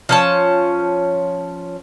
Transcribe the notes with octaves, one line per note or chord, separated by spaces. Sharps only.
F3 C#4 A5